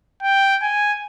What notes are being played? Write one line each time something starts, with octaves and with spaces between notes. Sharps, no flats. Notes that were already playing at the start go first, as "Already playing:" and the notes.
G5
G#5